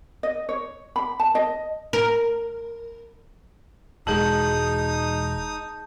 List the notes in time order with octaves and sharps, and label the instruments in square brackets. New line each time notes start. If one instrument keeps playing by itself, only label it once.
[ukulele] D#5
C#5
B5
A5
D#5
[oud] A#4
[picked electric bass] E1 [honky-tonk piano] G#3 F#7 [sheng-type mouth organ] D#4 D#6 [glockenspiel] A5 G6